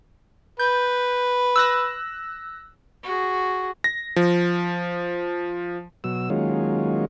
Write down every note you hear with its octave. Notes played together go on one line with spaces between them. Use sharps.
B4 G6
E6 F#6 A#6
F#4 G#4
A#6
F3
B2 F#3 E6
D#3 F#3 G#3 A#3 C#4 F4